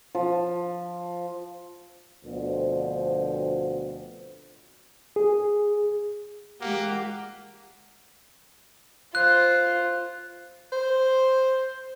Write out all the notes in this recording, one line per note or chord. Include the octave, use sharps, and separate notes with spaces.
F3
D2 B2 D3 F3 C4 C5
G#4
G#3 A#3 G4 F#5
F4 C5 F#6
C5